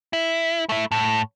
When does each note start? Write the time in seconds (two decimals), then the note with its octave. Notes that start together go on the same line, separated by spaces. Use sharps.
0.13 E4
0.69 A3 E4
0.91 A2